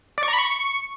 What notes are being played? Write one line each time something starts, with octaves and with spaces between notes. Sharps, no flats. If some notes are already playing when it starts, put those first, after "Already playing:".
D5
C#6
A#5
B5
C#6